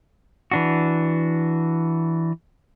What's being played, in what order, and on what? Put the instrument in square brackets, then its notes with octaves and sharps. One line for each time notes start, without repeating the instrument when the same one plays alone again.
[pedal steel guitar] E3 D4 F#4